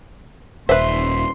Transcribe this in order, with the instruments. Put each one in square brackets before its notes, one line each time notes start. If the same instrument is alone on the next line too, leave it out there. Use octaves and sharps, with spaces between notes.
[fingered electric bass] D#1 [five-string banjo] B4 C5 [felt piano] E5 [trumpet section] C6